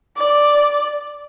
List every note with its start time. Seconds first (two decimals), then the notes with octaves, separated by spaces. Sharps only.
0.16 D5